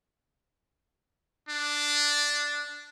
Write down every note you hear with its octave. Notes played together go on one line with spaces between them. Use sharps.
D4